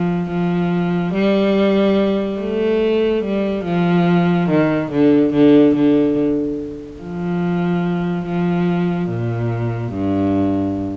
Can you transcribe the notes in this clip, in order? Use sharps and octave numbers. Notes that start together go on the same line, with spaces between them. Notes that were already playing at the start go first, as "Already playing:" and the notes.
Already playing: F3
F3
G3
A3
G3
F3
D#3
D3
D3
D3
F3
F3
A#2
G2